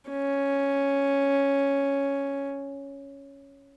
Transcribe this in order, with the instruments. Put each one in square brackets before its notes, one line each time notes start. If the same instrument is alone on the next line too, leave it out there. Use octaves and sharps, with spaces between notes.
[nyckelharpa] C#4